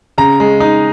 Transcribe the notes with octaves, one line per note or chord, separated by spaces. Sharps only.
C#3 A#5
G#3
D#4